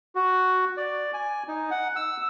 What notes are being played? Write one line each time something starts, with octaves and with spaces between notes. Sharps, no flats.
F#4
D5
G#5
D#4
F#5
E6